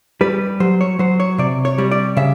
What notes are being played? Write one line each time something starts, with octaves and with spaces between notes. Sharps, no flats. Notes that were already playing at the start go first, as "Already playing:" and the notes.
G3 B4
F#3 C5
C#5
F#3 C5
C#5
C3 D5
C#5
G3
D5
C#3 E5